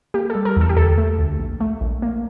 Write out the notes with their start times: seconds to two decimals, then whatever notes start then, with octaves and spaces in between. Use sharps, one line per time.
0.14 A#3 G4
0.30 A4
0.35 G3
0.45 A#4
0.56 E2 A4
0.69 G4
0.77 D2 A4
0.98 A3
1.19 D2
1.39 A#1
1.60 A3
1.81 A#1
2.02 A#3